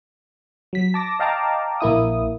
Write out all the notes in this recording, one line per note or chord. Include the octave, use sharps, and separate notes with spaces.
F#3 B6
A5 D6 A#6
D#5 F5 G5 A5 A#5 D6
A#1 A#3 E4 D#6